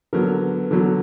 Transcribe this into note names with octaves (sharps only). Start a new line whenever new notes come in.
D3 F#3 B3 A#4
D3 F#3 B3